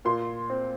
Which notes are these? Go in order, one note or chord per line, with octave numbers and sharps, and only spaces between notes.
A#2 C6
C4